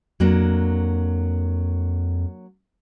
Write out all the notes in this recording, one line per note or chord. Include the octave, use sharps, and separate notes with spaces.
F2 F#3 A#3 D4